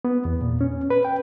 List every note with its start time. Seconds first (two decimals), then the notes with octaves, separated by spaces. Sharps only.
0.05 B3
0.25 E2
0.41 A#2
0.61 C#4
0.90 B4
1.05 G5